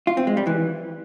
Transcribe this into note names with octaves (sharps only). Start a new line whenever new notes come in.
F4
C4
G#3
G3
E3